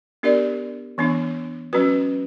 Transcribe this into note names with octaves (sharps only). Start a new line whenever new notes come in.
B3 D4 G4 A#4 D5
E3 B3 D4
F#3 C#4 F#4 B4